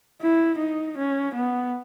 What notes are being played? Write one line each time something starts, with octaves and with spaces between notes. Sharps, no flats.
E4
D#4
C#4
B3